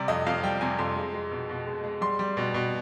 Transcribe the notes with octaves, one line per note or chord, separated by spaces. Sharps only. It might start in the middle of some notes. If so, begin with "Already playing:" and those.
Already playing: C3 G3 D5
F2 D#5
F2 F5
G3 G5
C3 G#5
F2 C6
G#3
G#3
B2
B2
G#3
G#3
G3 C6
G3
B2
B2